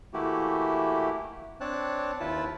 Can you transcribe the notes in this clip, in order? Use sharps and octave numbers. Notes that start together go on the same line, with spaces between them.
E3 A3 A#3 E4 F#4 G4
C4 D4 C#5 A5 F#6
D#2 E4 F4 B4 A5